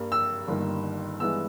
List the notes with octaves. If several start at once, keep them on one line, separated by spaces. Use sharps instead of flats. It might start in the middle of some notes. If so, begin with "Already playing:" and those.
Already playing: G2 G3 A#3
E6
G1 G2 D#3 A#3
G2 E3 G#3 B3 E6